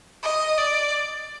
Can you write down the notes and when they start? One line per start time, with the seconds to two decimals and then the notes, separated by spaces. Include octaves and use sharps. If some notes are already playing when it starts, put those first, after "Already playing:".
0.23 D#5
0.58 D5